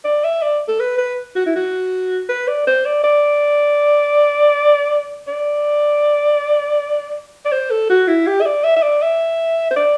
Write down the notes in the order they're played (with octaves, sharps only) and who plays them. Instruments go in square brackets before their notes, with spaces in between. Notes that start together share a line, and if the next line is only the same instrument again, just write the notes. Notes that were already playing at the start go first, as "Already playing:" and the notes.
[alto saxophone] D5
E5
D5
A4
B4
B4
F#4
E4
F#4
B4
D5
C5
D5
D5
D5
D5
C5
A4
F#4
E4
G4
E5
D5
E5
E5
D5
E5
C5
D5